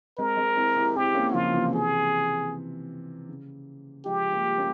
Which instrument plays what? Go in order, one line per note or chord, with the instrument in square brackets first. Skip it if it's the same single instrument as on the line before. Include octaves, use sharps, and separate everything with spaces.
[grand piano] G#3 C4 [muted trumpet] A#4
[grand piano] G#3 C4
C4 E4
E4 G4
[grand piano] C4 E4 [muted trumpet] G4
[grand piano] A#3 C#4
[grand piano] C#3 F3 [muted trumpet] F4
[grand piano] C3 E3
[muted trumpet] G#4
[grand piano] C#3
[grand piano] F3 G#3 [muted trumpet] G4
[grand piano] G3 A#3
A#3 C#4